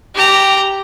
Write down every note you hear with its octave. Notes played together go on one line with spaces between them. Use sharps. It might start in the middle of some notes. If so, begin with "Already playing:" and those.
G4 A#5